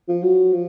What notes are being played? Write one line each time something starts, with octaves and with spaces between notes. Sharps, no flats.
F3
F#3
F3